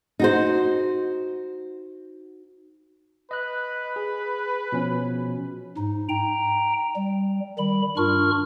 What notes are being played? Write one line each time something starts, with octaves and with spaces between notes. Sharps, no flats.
D#4 F#4 C5
B4 D#5 F#6
G#4
B2 F3 C#4
G#2 D#4
G5 A#5
G3
D#3 G3 B5
G2 D4 F4 A#4 C#6 F6